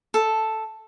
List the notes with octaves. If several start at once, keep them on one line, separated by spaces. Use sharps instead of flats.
A4